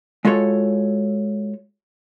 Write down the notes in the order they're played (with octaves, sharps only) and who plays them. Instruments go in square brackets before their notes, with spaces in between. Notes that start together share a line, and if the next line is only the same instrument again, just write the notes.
[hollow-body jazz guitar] G#3 F4 F#4 A4 C#5